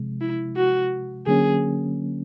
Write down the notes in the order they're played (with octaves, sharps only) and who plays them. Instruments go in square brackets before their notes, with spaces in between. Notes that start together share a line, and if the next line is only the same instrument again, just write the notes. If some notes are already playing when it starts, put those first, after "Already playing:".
Already playing: [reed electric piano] C3 F3 G#3
[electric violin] E4
F#4
[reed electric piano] D3 F#3 A#3 C#4 [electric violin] G#4